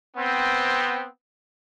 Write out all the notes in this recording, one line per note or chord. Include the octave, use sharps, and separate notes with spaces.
B3 C4